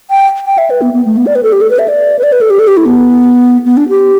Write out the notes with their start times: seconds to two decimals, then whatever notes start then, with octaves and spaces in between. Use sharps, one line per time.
0.10 G5
0.46 G5
0.58 E5
0.70 B4
0.82 B3
0.93 B3
1.05 A3
1.17 B3
1.26 D5
1.35 B4
1.43 A4
1.53 G4
1.61 A4
1.70 B4
1.79 E5
1.88 D5
2.19 B4
2.23 D5
2.32 B4
2.41 A4
2.50 G4
2.59 A4
2.68 G4
2.77 E4
2.86 B3
3.65 B3
3.77 D4
3.89 G4